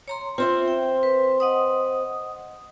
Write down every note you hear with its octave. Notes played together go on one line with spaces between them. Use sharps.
C#5 A#5 C6
C4 F4 C5 E5
G5
B4
D#5 F#5 D#6